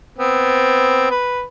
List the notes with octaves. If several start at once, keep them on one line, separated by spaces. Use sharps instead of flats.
B3 C4
B4